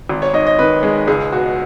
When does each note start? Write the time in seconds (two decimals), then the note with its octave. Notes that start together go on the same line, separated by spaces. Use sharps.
0.09 G#1
0.22 C#5
0.34 G#2 D#5
0.47 D#5
0.59 D#3 B4
0.83 G#3
1.07 C#2 G#4
1.32 B2 F#4